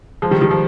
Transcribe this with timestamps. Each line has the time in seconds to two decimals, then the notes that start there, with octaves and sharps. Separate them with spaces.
0.22 F3 G#3
0.31 D#3 G3
0.41 D#3 G3
0.51 F3